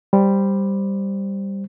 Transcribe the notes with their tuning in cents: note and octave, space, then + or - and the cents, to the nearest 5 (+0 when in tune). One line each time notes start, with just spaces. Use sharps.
G3 +5 C5 +0